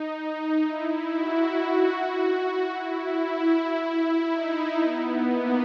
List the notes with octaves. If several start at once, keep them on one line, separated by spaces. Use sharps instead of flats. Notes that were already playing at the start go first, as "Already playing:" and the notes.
Already playing: D#4
D#4
E4
F#4
E4
D#4
B3
A#3